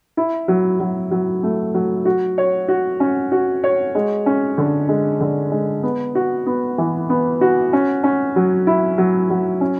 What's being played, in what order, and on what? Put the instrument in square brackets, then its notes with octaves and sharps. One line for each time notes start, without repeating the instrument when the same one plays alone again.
[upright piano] E4
F#3
F#3
F#3
A3
F#3
F#4
C#5
F#4
C#4
F#4
C#5
G#3
C#4
D3
G#3
D3
G#3
B3
F#4
B3
E3
B3
F#4
C#4
C#4
F#3
E4
F#3
F#3
C#4